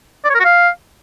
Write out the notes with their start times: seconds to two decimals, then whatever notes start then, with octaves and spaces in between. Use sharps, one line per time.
0.25 D5
0.30 C#5
0.35 A#4
0.40 F#4
0.45 F5